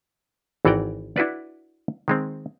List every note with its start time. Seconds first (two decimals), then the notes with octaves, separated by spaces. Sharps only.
0.65 G#1 E3 F#4 D5 G5 A#5
1.16 D4 E4 F#4 B4 D5
2.08 D#3 G#3 C4